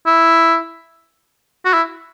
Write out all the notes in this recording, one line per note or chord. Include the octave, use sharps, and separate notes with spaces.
E4
F#4
E4